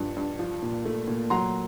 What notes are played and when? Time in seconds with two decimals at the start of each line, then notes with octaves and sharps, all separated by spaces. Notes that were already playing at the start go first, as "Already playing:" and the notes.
Already playing: G2 F3
0.16 G2
0.39 F3
0.62 A#2
0.85 A3
1.08 A#2
1.30 F#3 A#5 C6